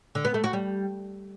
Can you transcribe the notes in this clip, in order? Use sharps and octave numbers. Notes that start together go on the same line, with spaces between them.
D3
B3
A3
F#4
G3